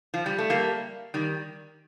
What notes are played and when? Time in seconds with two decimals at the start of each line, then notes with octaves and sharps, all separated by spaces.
0.14 F3
0.26 G3
0.38 A3
0.50 G3 A#3
1.14 D#3 G3